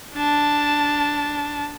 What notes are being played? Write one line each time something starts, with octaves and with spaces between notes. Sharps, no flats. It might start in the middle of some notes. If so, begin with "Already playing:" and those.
D4 A5